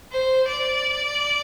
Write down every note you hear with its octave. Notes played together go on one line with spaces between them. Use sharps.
C5
D5